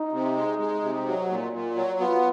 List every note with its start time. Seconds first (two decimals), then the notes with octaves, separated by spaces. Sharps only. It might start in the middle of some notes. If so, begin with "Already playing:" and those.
Already playing: D#4
0.12 C3
0.36 G#3
0.59 G#3
0.82 C3
1.06 F#3
1.29 A#2
1.53 A#2
1.76 F#3
2.00 B3 F4